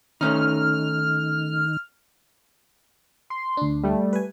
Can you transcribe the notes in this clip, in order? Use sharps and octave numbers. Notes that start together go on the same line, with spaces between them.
D#3 A3 C#4 D#4 F6
C6
D2 D4
G3 A3
B4 G#5